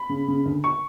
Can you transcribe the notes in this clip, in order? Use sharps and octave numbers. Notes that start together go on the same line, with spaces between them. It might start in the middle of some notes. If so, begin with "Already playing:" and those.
Already playing: B5
C#3
C#3
D2
C#6